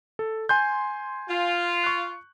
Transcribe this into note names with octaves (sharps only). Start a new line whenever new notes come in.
A4
G#5 C6 G6
F4
C#6 F#6